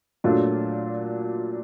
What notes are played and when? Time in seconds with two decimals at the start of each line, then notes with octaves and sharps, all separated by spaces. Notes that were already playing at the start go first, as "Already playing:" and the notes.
0.24 A#2 F#3 A3 D4 F4